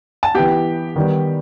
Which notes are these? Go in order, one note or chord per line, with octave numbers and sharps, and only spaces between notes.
A5
E3 B3 G4 G5
D#3 G3 B3